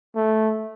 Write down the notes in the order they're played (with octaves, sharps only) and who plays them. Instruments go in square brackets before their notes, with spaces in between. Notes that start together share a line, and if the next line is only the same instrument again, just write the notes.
[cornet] A3